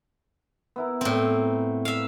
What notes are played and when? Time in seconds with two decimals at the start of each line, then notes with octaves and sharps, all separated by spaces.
0.76 B3 E4 A#4
1.01 A2 C4
1.85 E5 F5